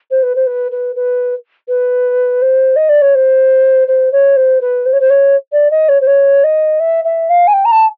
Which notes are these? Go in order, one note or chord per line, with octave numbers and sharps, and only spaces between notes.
C5
B4
C5
B4
B4
B4
B4
C5
D#5
D5
C#5
C5
C5
C#5
C5
B4
C5
C#5
C5
C#5
D5
D#5
C#5
C5
C#5
D#5
E5
E5
F5
G#5
G5
A#5
A5